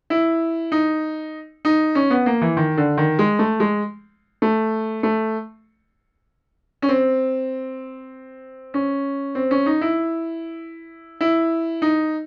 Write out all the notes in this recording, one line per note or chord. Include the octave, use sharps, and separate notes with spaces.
E4
D#4
D#4
C#4
B3
A#3
E3
D#3
D3
D#3
G#3
A3
G#3
A3
A3
C#4
C4
C#4
C4
C#4
D#4
E4
E4
D#4